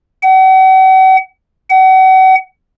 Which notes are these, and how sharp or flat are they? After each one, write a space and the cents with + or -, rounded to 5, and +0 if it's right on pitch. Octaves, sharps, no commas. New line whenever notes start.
F#5 +40
F#5 +35